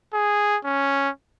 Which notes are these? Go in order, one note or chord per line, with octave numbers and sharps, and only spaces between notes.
G#4
C#4